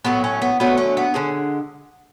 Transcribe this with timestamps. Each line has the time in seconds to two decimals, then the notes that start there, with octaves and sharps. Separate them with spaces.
0.05 A2 F#3 A3 B3
0.24 C#4
0.42 B3
0.60 D3 F#3 A3 B3
0.78 C#4
0.97 B3
1.14 D3 G#3 C#4